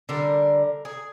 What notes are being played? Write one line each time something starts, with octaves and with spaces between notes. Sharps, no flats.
D3 G3 A#4
G#4